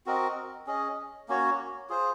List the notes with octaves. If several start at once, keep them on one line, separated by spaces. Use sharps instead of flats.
C4 F#4 A#4 D#5
C#4 G#4 D#5
A#3 C#4 F#4 C#5
F4 G#4 C5